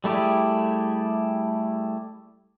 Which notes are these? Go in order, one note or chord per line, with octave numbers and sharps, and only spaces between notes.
G3 A3 E4 G4 G#4